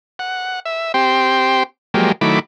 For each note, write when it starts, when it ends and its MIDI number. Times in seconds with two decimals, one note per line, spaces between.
0.19 0.60 78
0.66 0.92 76
0.94 1.63 60
0.94 1.63 67
0.94 1.63 79
0.94 1.63 84
1.94 2.12 53
1.94 2.12 54
1.94 2.12 56
1.94 2.12 58
1.94 2.12 67
2.21 2.39 51
2.21 2.39 54
2.21 2.39 57
2.21 2.39 64
2.21 2.39 83
2.21 2.39 86